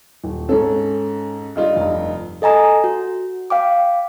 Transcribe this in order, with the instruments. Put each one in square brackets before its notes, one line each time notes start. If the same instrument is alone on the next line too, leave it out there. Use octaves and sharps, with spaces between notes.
[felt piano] D#1
[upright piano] G#2 A4 [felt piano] C#4
[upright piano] G2 D#4 F4
[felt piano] F1 A#5
[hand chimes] A4 D#5 G#5 A#5 D#6
F#4
F5 G5 D6